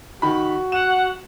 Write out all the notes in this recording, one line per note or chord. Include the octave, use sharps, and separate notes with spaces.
D#3 F#4 B5
F#5 E7